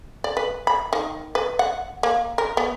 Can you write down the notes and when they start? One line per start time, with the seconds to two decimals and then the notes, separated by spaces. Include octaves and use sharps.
0.24 D5
0.37 B4
0.67 B5
0.93 D#3
1.35 B4
1.59 F#5
2.03 A#3
2.38 A#4
2.57 B3